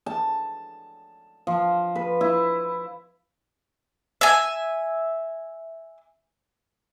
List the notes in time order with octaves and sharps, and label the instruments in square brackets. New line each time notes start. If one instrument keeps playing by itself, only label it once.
[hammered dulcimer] A5
F3
B4
E4
[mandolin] E5 G#5